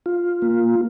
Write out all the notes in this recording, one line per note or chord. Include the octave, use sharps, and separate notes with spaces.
F4
A#3